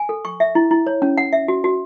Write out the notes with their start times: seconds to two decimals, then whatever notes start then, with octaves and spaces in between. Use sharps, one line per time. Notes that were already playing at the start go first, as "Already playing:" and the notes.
Already playing: G#5
0.09 A4
0.25 C#6
0.40 E5
0.55 E4
0.71 E4
0.87 C#5
1.02 C#4
1.18 F#5
1.33 E5
1.48 F#4
1.64 F#4